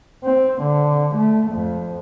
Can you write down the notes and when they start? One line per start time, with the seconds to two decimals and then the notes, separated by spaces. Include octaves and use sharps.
0.24 C4
0.62 D3
1.16 A3
1.51 F2